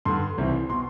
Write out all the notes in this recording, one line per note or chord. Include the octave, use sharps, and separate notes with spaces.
G2 D3 C6
C2 C3 E3
B2 C6